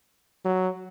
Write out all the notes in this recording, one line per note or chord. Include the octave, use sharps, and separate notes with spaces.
F#3